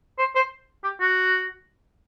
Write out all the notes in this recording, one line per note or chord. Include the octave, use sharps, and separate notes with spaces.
C5
C5
G4
F#4